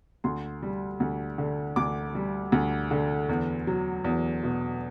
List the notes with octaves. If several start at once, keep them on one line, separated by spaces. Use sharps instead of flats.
D2 C6
G3
D2
D3
D2 D6
G3
D2
D3
E2
F#3
E2
B2